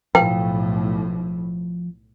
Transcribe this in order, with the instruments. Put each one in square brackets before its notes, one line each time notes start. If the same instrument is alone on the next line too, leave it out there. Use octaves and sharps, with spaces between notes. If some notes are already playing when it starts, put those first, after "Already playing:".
[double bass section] B1 A2 [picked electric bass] F3 [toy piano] G5